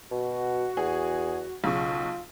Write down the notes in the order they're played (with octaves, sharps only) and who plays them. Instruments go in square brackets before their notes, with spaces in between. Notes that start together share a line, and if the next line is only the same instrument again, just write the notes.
[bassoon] B2 [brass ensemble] F#4
[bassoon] E2 [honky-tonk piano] G#4
[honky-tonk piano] B1 C#3 C#6 [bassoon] F4